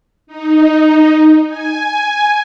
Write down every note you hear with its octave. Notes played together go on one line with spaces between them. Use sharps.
D#4
G#5